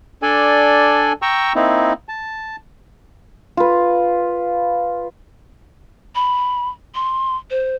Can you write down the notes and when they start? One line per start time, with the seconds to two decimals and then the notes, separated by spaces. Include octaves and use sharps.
0.22 D4 A4 D5 G#5
1.22 G5 A#5 C#6 E6
1.55 A#3 C4 D#4 E4
2.09 A5
3.57 F4 B4
6.15 B5
6.95 C6
7.50 C5